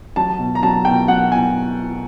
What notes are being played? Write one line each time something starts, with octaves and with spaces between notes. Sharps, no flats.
F#3 A5
B2
A#5
F#3 A5
B2 G5
F#3 F#5
B2 G#5